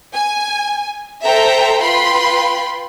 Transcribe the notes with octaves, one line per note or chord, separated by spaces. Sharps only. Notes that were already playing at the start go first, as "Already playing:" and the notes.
G#5
A4 C5 E5 G5 A#5
F4 B4 G5 B5 C6